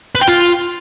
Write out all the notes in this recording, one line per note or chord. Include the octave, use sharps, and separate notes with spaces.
B4
G5
F4